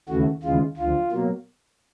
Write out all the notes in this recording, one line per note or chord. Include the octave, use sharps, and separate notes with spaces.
D#2 C#3 E3 A3 F#4
D#2 C#3 E3 G#3 F4
D2 D3 F3 F4
B2 F#3 A#3